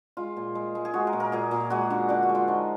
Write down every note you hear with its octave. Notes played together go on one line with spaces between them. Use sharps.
G#3 F4
A#2
G#3
G#3
G#4
G#3 F#4
A#4
A#2
A#4
A#2 G#4
A#2
G#3 F#4
D3
D3 D5
F#4
G#3
F4
F3 D#4